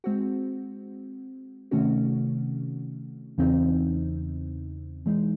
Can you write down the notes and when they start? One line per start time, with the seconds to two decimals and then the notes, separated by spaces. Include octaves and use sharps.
0.04 G#3 C4 F#4
1.71 C3 D#3 A3 C#4 F#4
3.38 E2 C#3 E3 C4 D#4
5.06 E3 G#3 D#4